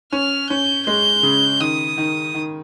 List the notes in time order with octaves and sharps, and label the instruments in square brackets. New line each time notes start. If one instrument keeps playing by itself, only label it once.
[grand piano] C#4 [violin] F6
[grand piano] C#4 [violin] G6
[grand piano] G#3 [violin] G6
[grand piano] C#3
[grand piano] D#3 [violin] D#6
[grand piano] D#3
D#3